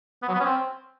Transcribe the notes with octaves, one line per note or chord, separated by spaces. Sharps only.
B3
F#3
B3
C#4
C4